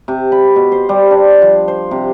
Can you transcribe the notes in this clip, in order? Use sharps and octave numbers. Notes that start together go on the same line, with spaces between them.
C3
B5
B2
C5
G3
D4
F3
C5
C3